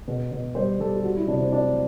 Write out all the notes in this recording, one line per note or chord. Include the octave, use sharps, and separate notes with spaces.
B2
B2
G3 C5
G3 A4
G4
F#3 F#4
E4
C3 D4
C4
F#3 D4